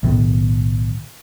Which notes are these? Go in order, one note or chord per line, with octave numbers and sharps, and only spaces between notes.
B1 A2 D#3 B3